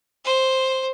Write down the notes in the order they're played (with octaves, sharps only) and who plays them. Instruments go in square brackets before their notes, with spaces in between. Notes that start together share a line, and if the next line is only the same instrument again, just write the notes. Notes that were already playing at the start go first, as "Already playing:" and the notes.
[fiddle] C5